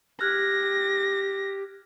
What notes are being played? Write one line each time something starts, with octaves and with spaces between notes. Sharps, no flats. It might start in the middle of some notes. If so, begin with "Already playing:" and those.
G4 F6 F#6 G#6 A#6